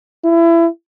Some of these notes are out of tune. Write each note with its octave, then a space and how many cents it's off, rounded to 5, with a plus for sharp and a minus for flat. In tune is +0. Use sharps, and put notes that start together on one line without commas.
E4 +25